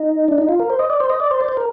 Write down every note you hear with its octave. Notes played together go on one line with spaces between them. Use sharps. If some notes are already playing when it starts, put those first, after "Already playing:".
Already playing: D#4
D4
D#4
F4
A#4
C5
D#5
D5
C5
D#5
D5
C5
D5
C5
A#4